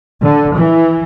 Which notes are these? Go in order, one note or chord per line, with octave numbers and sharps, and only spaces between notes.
D3
E3